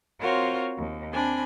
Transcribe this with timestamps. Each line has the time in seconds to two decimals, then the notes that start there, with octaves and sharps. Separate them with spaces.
0.19 C4 F4 F#4 A#4 C5 C#5
0.78 D#2
1.12 C4 D4 G#5 B5